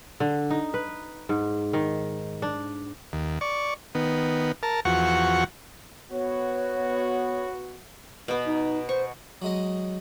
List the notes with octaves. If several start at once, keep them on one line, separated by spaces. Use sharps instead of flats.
D3
D#4
B4
G#2
D#3
D4
D#2
D5 C#6
D#3 B3
A#4 A5
E2 F3 F#4 F#5 C#6
B3 F#4 C#5
B2 B3
D#4
C5 C#6
F#3 G#3 D#5